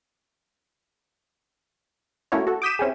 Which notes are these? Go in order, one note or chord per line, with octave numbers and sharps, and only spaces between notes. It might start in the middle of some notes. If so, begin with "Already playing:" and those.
A3 A#3 C#4 E4 F#4 C#5
F#4 A4
D6 D#6 G6 B6 D#7 E7
C4 C#4 E4 G4 G#4